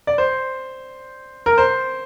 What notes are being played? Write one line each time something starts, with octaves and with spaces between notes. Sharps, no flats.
D5
C5
A#4
C5